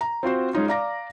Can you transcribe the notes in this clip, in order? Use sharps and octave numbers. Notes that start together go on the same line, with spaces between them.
A#5
C4 F4 F#4 C5
G#3 C#4 D#4 F4
D5 F5 A#5 D6 A#6